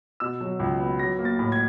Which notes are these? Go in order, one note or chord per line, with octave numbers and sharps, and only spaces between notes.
B2 E6
F#3
C#2
B3
F#3 A#6
A#3
A6
A2
G#6